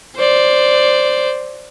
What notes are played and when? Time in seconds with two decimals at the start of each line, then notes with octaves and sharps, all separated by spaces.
0.16 C5 D5